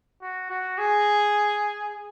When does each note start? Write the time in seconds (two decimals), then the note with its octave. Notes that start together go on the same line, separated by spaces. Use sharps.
0.22 F#4
0.50 F#4
0.78 G#4